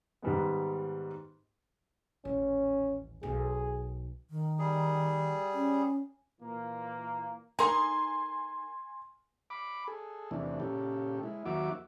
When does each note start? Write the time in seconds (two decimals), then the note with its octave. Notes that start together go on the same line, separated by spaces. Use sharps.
0.22 G#2 D#3 G3 G#3 B3
2.25 D#1 A1 C#4
3.23 B1 G#4
4.30 D#3
4.59 G3 G#4
5.54 C#4
6.41 A#2 E3 A#3
7.59 D#4 A#4 G#5 C6
9.50 B5 D6
9.88 G#4 A4
10.31 E2 C3 E3 A3 D4
10.60 A#2 C#3 G4 A4
11.23 G#3 E4
11.46 D#2 F#3 A#3 F#4 E5 D6